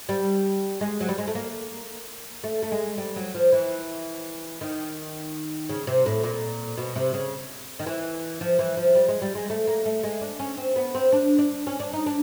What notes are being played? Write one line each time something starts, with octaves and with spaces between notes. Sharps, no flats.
G3
G#3
F#3
G3
G#3
A3
A#3
A3
A3
G#3
G3
F#3
F3
E3
D#3
C#3
C3
A2
A#2
B2
C3
C#3
D#3
E3
F3
E3
F3
G3
G#3
G3
G#3
A3
A#3
A3
G#3
D4
C#4
C4
B3
C4
D4
D4
C#4
D4
D#4
D4